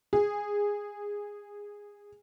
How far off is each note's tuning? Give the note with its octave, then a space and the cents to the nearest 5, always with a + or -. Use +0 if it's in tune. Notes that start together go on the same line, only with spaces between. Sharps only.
G#4 -15